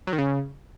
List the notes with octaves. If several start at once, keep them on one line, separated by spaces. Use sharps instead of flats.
F#3
D#3
C#3